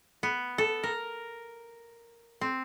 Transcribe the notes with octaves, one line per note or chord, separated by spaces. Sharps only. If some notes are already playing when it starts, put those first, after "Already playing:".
B3
A4
A#4
C4